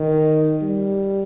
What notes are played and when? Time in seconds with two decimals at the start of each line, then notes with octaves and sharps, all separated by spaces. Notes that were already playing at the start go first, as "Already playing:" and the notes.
Already playing: D#3
0.61 G3